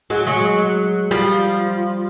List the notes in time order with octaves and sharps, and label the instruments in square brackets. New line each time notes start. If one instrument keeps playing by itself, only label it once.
[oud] F#3 G#3
F#3 G#3
F3 G3